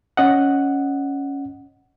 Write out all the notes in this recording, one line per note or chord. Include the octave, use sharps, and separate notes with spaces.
C#4 D#5 F#5